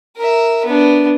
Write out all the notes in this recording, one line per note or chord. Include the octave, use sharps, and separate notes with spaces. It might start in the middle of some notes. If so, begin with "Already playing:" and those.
A#4 E5
B3 D4